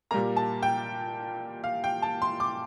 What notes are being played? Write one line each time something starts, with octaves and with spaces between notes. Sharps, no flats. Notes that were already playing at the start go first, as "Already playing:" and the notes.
A#2 G3 A#3 A#5
A5
G5
F5
G5
A5
C6
D6